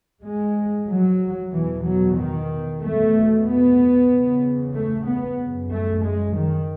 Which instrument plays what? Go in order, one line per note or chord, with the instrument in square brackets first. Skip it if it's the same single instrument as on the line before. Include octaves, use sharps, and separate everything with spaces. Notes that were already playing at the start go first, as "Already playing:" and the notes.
[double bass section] G#2 G#3
F#3
E2 B2 E3
F#3
D#3
E2 B2 A3
B3
E2 C#3
A3
B3
F#2 C#3
A3
G#3
D#3